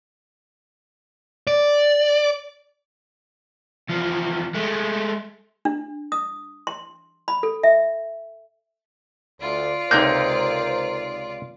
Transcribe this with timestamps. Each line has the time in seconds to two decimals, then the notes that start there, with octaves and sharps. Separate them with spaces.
1.47 D5
3.89 E2 F3
4.54 G#3 A3
5.65 D4
6.12 D#6
6.67 C6
7.28 B5
7.43 A4
7.63 E5
9.41 D2 F4 D5
9.91 C#2 C3 A#3 D#4 A#4 C5 G6